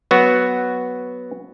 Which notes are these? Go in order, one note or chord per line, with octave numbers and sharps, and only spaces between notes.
F#3 B3 F#4